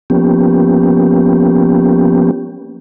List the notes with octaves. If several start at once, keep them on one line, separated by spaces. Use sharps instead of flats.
F3 A#3 B3 C#4 G4